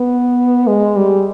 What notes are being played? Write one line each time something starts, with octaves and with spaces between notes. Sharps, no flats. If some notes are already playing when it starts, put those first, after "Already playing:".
Already playing: B3
G#3
G3